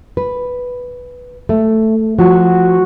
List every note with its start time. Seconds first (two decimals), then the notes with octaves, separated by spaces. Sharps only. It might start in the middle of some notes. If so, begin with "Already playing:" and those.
0.17 B4
1.49 A3
2.19 F3 F#4